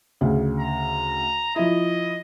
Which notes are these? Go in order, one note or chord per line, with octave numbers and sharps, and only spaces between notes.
D2 C#3
A#5
F3 E4 D#5